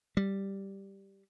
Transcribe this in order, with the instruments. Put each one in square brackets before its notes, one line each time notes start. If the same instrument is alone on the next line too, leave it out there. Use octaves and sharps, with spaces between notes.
[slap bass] G3